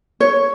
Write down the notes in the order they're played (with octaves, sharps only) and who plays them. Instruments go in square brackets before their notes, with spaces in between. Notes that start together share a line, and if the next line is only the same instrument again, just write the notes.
[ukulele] C#5